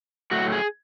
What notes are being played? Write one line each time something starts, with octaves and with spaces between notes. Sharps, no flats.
A2 F#3 A3 F#4
G#4